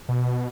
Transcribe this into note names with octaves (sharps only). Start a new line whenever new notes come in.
B2